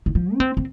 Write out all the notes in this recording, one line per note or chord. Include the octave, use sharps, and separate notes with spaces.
D#3
F3
C#4
C4
C4